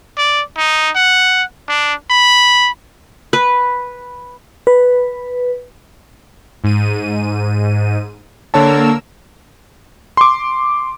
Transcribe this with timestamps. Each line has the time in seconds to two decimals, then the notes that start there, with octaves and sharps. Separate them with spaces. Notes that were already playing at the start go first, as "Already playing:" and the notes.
0.18 D5
0.57 D#4
0.96 F#5
1.69 D4
2.10 B5
3.33 B4
4.67 B4
6.64 G#2 D#7
8.54 D3 A#3 A#4 C#5 A5 E6
10.17 C6 D6